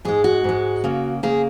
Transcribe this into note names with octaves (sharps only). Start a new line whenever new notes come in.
G#2 G#3 G#4
F#4
G#2 G#3
C#3 A#3
C#3 A#3 G#4